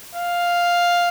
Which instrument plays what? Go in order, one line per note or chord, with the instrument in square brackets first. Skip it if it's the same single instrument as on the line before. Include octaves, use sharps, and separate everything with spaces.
[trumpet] F5